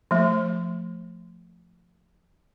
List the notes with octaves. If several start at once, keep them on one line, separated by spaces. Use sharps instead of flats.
F3 A3